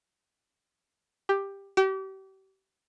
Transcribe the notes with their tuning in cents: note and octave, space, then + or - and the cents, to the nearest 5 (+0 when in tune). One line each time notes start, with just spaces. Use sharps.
G4 +10
G4 -35